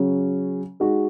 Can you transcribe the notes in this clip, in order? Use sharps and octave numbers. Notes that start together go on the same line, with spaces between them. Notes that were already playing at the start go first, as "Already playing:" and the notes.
Already playing: C#3 F#3 C#4
G#3 D#4 F#4